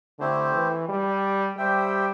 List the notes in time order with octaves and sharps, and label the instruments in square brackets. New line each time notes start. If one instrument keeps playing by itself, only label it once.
[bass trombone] D3 [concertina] A3 C4 E4 G4 C5
[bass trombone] E3
G3
[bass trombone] G3 [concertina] G4 C5 E5 G5